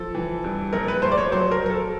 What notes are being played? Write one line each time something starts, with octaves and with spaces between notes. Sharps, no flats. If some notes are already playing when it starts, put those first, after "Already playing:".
Already playing: F3 A4
E3
G2
A#1 A#4
B4
A3 C5
D5
C#5
F#3 C5
A#4
F#3
A#4
A4